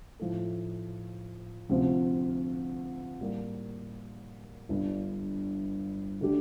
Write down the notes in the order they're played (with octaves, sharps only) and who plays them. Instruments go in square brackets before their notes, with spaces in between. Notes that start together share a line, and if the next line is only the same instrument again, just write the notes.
[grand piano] A2 F3 A3
D2 C3 F3 C4
A2 G3 A#3
G1 G2 D3
D3 A3 D4 G4